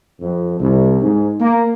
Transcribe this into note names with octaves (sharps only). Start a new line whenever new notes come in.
F2
C2
G#2
A#3